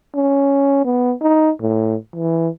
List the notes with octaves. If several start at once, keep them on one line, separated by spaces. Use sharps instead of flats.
C#4
B3
D#4
A2
E3